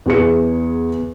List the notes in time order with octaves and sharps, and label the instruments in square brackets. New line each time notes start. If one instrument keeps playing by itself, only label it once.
[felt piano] E2 G#4 C#7